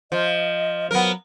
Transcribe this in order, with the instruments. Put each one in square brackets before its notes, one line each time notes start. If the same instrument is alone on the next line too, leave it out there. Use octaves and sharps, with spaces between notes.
[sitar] F3 [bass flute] D#5
[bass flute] F#3 [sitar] B3 A#4